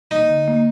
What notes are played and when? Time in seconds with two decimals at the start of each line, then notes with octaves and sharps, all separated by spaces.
0.11 A#3 D#4
0.29 D3
0.48 A#3